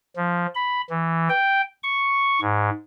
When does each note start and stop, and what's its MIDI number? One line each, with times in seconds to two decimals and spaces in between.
0.16 0.46 53
0.55 0.81 83
0.90 1.28 52
1.29 1.62 79
1.83 2.40 85
2.41 2.70 44